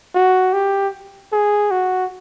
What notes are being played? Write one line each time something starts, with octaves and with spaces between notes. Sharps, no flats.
F#4
G4
G#4
F#4